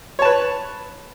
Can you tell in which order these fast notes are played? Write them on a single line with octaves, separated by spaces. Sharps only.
C#5 A5 B4